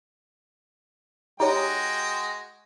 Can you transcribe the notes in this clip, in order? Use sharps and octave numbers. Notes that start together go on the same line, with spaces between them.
G#3 D#4 F#4 G4 C#5 G5